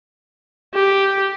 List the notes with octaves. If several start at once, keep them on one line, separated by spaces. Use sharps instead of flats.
G4